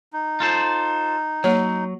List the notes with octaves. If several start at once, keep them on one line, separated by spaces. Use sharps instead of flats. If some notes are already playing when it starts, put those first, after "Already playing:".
D#4
F4 A4 C5
F#3 A#3 C#5